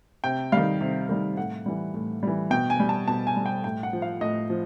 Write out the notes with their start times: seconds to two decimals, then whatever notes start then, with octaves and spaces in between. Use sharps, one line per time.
0.24 C3 G5
0.52 D#3 G3 F5
0.81 C3
1.09 D#3 G3
1.37 A2 F#5
1.66 E3 G3
1.94 A2
2.23 E3 G3
2.51 B2 G5
2.70 G#5
2.80 G3
2.89 A5
3.07 B2 A5
3.27 G#5
3.36 G3
3.46 G5
3.64 A2 G5
3.83 F#5
3.93 F3
4.02 F5
4.21 A2 D#5
4.50 F3